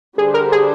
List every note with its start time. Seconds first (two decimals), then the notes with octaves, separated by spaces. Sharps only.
0.17 D3 G3 D4 G4 G#4 C5
0.34 A#4
0.52 G#4